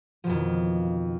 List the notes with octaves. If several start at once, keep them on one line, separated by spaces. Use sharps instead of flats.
F2 B2 D#3 F3